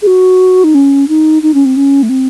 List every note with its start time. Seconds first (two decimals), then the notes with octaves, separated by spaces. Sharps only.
0.02 G#4
0.07 F#4
0.64 D#4
0.74 C#4
1.08 D#4
1.43 D#4
1.54 C#4
1.65 C4
1.76 C#4
2.03 A3
2.09 C4